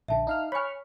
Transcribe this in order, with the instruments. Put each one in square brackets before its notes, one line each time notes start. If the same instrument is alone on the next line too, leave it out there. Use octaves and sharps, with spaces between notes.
[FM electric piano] A#1 D3 [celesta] E5 A5
[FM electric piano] D#4 F5 F6
[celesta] C#5 G#5 [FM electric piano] B5 C#6 F6